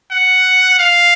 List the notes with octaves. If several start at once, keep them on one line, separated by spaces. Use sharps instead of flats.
F#5
F5